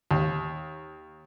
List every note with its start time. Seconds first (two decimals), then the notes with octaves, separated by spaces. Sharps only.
0.11 D#2